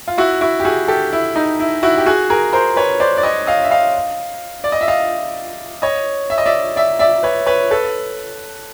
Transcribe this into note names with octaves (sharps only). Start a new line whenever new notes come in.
F4
E4 F#4
E4 F#4
G4
F#4 G#4
G4 A4
E4
D#4
E4
E4 F#4
G4
F#4 G#4
G#4 A#4
A#4 C5
B4 C#5
C5 D5
D5
C#5 D#5
D#5 F5
E5
D#5 F5
D5
D#5
E5
D#5 F5
C#5 D#5
E5
D#5
D5 E5
D5 E5
D5 E5
B4 C#5
B4 C#5
A4 B4